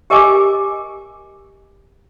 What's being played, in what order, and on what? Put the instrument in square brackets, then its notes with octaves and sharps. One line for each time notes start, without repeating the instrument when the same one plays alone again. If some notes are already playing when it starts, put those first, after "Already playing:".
[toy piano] G4 A#4 D#5 G#5 D6